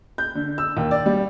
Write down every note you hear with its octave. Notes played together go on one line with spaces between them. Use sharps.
G6
D3
E6
D#2
D5
G3